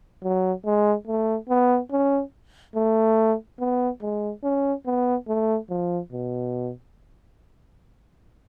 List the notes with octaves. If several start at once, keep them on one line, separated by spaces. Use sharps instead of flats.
F#3
G#3
A3
B3
C#4
A3
B3
G#3
C#4
B3
A3
F3
B2